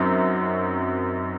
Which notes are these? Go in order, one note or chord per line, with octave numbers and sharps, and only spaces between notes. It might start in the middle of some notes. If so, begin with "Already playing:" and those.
Already playing: F#2 F#3 C4 D#4